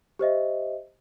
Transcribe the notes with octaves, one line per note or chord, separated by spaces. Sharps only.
G4 C5 D#5 E5